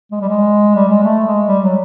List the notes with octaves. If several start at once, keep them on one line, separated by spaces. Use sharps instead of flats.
G#3
G3
G#3
G3
G#3
A3
G#3
G3
F#3